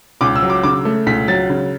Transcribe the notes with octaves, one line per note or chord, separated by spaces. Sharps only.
C#2 D6
E6
F#3
D6
C#3 D6
A3
C#2 B6
F#3 A6
C#3